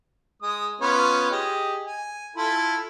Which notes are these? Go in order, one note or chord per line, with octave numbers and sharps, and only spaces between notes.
G#3 D#6
B3 C#4 F4
G4 G#4 D#5
G#5
E4 F4 A4